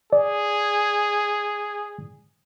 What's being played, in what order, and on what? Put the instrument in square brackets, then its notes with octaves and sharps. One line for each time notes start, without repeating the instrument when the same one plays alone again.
[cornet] G#4 [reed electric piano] D5